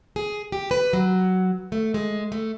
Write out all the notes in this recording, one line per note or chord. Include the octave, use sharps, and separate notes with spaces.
G#4
G4
B4
F#3
A3
G#3
A3